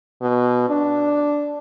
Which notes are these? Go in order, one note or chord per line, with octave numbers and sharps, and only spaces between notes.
B2
D4